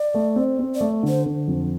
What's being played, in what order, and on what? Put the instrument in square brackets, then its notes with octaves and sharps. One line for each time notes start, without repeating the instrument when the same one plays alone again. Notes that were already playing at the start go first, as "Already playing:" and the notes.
Already playing: [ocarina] D5
[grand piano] A3
C4
C4
[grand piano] A3 [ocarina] D5
[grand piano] D3 [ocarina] C5
[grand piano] D3
F2